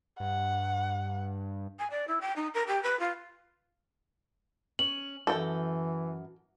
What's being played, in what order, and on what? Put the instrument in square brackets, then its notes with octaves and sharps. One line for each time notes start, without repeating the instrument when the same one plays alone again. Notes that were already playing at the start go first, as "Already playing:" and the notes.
[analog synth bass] G2 [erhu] F#5
[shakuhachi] G#5
D5
E4
G5
D#4
A#4
G4
B4
F4
[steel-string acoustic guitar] C#4 [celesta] F#7
[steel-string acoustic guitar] F#2 [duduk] E3 [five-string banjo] A4 G5